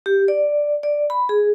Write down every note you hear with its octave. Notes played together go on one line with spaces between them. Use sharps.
G4
D5
D5
B5
G#4